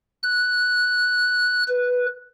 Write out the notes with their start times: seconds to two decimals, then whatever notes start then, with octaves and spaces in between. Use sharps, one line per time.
0.23 F#6
1.68 B4